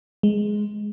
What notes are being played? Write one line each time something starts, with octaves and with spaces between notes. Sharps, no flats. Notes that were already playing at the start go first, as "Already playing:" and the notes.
G#3